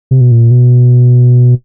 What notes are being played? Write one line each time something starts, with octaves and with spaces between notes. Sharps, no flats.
C3
B2
A#2
B2